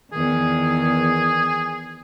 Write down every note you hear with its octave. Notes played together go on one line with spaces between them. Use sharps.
E2 D#3 G#4